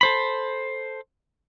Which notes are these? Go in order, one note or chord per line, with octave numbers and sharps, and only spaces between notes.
A4 C5 B5